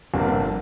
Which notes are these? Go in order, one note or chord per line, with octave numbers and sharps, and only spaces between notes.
G1 F2 C3 A#3 D4